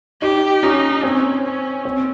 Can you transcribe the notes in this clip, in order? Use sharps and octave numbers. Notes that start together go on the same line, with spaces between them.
D#4 G4
C#4 D#4
C4 C#4
C#4
C4